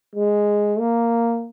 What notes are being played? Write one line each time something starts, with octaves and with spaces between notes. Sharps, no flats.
G#3
A#3